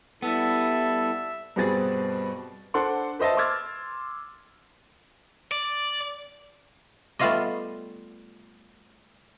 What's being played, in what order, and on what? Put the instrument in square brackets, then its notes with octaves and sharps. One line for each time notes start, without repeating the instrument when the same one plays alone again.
[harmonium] G3 E4 [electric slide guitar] B3 [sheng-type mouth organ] A4 [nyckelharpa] E5
[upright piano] G2 B2 B3 C4 G#4 A6
D4 A4 C5 F#5 C6
B4 C5 D#5 E5 A5
C6 D6 E6 F6 G#6 A6
[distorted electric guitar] D5
[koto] G3 A3 B3 F4 D5 D#5